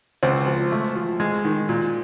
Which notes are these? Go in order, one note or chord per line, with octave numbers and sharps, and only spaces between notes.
C#2 C4
F3
A3
F3
G#3
D#3
A#2